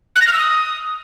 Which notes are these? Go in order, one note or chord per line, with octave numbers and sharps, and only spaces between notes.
F#6
A#6
F6
E6
D#6